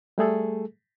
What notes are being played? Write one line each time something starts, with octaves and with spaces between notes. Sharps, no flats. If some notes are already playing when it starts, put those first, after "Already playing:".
G3 A3 G#4 A4